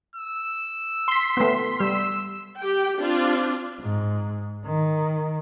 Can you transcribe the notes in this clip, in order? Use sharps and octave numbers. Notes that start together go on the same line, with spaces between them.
E6
C6 B6
A3 B3
G3 E6
G4 G5
C4 D4 F4
G#2
D#3